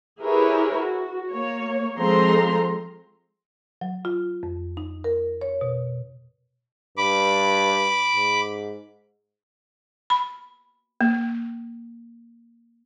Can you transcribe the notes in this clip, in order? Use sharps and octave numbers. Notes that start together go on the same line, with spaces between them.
E4 G4 G#4 A#4 B4 C#5
F#4
A#3 C#5
F3 G#3 C4 A4 A#5 C6
F#3
F4
F2
D#4
A#4
C#5
B2
G2 B5 D6
G#2
B5
A#3